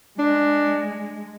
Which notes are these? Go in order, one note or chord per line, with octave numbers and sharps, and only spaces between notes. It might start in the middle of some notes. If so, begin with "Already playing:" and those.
G#3 D4